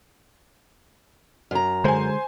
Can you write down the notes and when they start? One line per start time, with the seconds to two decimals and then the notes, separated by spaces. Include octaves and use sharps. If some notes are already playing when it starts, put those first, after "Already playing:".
1.51 F#2 A#5
1.84 D3 G#3 C5 G#5